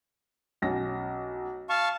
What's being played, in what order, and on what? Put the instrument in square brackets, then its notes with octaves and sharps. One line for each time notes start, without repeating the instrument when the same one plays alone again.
[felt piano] B1 C#4 A#6
[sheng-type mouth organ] F5 A5 C#6